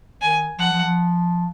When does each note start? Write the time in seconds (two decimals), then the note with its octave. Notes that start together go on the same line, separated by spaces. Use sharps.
0.21 D#3 G#5
0.59 F3 F#5
0.72 F3
0.84 F3